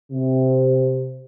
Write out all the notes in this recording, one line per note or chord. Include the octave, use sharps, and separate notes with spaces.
C3